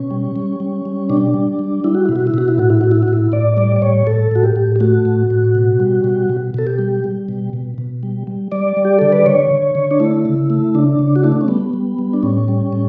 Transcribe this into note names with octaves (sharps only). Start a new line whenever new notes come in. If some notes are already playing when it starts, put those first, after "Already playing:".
Already playing: B2 C#4
G3
G3
G3
G3
B2 D4
G3
G3
G3 E4
F#4
B2 E4
F#4
E4
B2 F#4
E4
A2 F#4
E4
A2 F#4
E4
F#4
A2 E4
A2 D5
G3 D5
D5
A2 C#5
A2 A4
A2 F#4
G4
A2
G4
A3 F#4
A2
A2
B2
G3
B2
B2
B2 A4
G4
G3
G3
B2
B2
B2
G3
G3
G3 D5
G3
G4
D3 A4
B4
D3 C#5
D3
D3
D4
A3 E4
C#3
A3
C#3 D4
C#3
F#4
A3 E4
D4
C#4
G3 B3
G3
G3
D4
A2 C#4
G3
A2